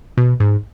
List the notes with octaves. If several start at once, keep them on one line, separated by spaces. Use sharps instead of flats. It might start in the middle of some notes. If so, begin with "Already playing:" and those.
B2
G#2